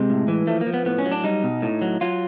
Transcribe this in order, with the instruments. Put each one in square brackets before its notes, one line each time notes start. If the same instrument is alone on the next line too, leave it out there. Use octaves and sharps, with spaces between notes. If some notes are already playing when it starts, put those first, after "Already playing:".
Already playing: [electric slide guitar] C3 G#3
A2
E3
F3 A3
A#3
F3
B3
A2 B3
C#4
F#3
D4
G3 D#4
B2
A2
F#3
F#3 F4